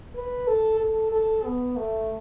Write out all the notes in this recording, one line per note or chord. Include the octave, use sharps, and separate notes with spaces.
B4
A4
A4
A4
B3
A3